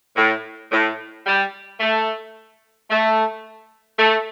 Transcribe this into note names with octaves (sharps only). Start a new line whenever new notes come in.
A2
A2
G3
A3
A3
A3